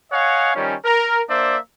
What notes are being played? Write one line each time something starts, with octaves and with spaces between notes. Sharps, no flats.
C#5 D#5 F5 F#5 G#5
D#3 F3 G3 C#4
A#4
A#3 D4 C5 D5 E5